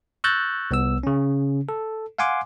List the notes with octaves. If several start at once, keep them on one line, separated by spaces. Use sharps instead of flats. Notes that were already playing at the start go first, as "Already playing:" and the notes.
C#6 E6 F#6 G6 A6 A#6
C2 B3 E6
C#3 C#4
A4
F5 F#5 G#5 C6 D6